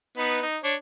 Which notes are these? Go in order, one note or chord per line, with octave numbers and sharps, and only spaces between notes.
B3 D#4 B4
D#4
D4 C#5